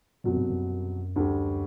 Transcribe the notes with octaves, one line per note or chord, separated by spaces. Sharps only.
C2 F#2 B2 F#3
G2
F#2
D2 D3 G3